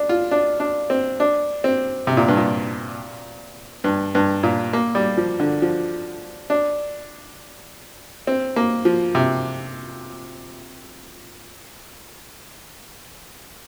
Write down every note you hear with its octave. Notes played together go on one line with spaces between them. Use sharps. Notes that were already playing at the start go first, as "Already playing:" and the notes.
Already playing: D4
F4
D4
D4
C4
D4
C4
C3
A#2
G2
A#2
G2
G2
A#2
A#3
G3
F3
D3
F3
D4
C4
A#3
F3
C3